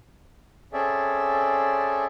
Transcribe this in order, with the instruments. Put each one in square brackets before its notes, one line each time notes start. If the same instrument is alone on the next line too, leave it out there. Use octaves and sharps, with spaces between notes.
[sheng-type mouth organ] C4 C#4 G#4 A4 D5 E5